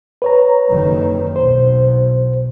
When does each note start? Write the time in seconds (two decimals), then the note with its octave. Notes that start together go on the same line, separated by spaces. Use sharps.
0.22 B4 C#5 A#5
0.69 F#1 F2 D#3
1.36 B1 E2 B2 C5